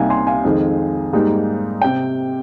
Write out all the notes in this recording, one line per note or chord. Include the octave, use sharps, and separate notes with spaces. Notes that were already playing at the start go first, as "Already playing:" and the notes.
Already playing: C2 C3 G3 A#3 D#4 F5 G#5
G#5 C6
F5 G#5
F2 D#3 G#3 D#4
G#2 G3 A#3 D#4
C3 G5